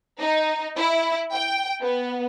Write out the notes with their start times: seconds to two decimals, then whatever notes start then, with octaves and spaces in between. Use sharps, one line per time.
0.21 D#4
0.76 E4
1.34 G5
1.81 B3